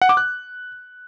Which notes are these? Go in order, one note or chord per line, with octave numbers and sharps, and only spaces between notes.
F#5
D6
F#6